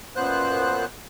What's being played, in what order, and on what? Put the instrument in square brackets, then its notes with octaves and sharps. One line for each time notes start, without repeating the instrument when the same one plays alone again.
[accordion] F#2 A#2 B3 C5 F#6